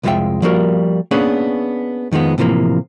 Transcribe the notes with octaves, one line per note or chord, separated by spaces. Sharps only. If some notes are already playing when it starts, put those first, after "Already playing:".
C2 F2 G#3 F4 E5 G5
F3 G3 A#3 F#4 G4 A#4
A#3 B3 C#4 D4 G#4 B4
F2 D#3 F3 G#3 B3
A2 C3 E3 F3 A#3